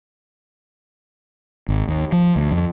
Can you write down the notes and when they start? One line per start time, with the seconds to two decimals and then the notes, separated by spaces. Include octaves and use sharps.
1.68 G#1
1.88 D#2
2.12 F3
2.36 D2
2.51 F2